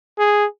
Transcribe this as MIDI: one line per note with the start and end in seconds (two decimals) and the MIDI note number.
0.19 0.45 68